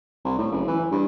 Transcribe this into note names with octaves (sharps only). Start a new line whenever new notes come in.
C2
A2
F#1
E3
G2